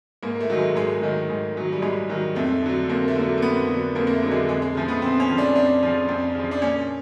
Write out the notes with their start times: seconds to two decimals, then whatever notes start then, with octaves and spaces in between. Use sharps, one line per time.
0.23 G#2 A#3
0.41 A3
0.50 D#3 F#3
0.58 G#3
0.75 G#2 G#3
1.02 D#3 F#3
1.30 G#2
1.56 D#3 F#3
1.72 G3
1.82 G#2 G#3
2.09 D#3 F#3
2.35 F2 A3
2.63 D3 F#3
2.89 F2 A#3
3.08 A3
3.16 D3 F#3 A#3
3.38 A#3
3.42 F2 B3
3.69 D3 F#3
3.95 F2 A#3
4.07 A#3
4.13 A3
4.23 D3 F#3
4.31 G#3
4.49 F2 G#3
4.62 G#3
4.75 C#3 F3 A3
4.88 B3
5.02 F2 C4
5.20 C#4
5.29 C#3 F3
5.38 D4
5.55 F2 D4
5.83 C#3 F3
6.09 F2
6.35 C#3 F3
6.51 D4
6.61 A#2 C#4